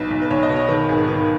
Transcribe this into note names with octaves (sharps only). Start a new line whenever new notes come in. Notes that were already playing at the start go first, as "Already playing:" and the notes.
Already playing: B1 B4
B1
B4
B1 C#5
D#5
B2
C#5
D#3 B4
G#1 G#4
D#3 B4